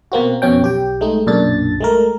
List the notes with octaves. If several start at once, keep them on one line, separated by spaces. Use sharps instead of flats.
B2 A#3 C4 F#4
F2 B2 C#4 G5
B1 G4 G5
G#3 A3 D#4
B1 F#2 A#2 D4 A6
G#3 A3 A#4